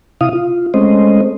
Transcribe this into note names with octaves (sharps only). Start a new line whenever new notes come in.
C3 E4 F5 D#6
F4
G#3 A3 C4 C#4 C5 D#5